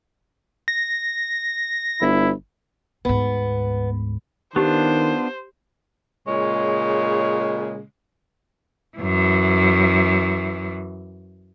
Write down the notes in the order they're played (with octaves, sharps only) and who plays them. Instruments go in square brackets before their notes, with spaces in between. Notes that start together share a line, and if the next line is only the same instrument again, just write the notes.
[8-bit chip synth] A#6
[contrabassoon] G1 [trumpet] E4
[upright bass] D2 G#2 [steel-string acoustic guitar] B3
[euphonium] D#3 [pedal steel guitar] B3 D4 F4 [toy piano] G4 [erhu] C5
[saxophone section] A#2 C#3 G#3 [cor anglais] C#5
[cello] F#2 E3